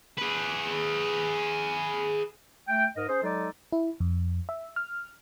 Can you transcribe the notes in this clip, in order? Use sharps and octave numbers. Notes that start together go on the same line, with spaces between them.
G#4 B4
A3 G5
G#2 A#4 D#5
C#4 G#4 C5
F#3 G#3 D#4 A4 D5
E4
F2
E5
F6